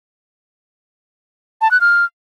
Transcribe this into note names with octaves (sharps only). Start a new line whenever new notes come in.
A5
F#6
F6